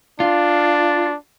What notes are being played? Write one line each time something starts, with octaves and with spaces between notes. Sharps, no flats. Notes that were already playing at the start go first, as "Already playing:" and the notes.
D4 F4